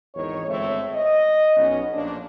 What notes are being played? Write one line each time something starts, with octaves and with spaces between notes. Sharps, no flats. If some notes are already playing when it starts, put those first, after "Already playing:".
G#1 E2 D#3 C#5
G1 G#3 A3 C4 C#5 E5
D#5
B1 B3 C#4
A#1 A#2 D4